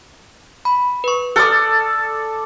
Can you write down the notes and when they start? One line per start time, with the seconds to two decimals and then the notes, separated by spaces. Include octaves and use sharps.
0.65 B5
1.04 B4 C#6
1.36 A4 D5 D#6 F6 F#6